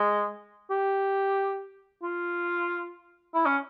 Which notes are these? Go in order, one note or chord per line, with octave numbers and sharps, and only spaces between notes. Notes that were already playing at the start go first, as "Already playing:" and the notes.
Already playing: G#3
G4
F4
E4
C#4